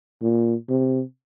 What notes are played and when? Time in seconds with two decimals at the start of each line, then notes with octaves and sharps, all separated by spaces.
0.22 A#2
0.69 C3